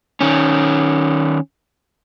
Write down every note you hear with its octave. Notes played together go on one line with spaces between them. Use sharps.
D#3 C#4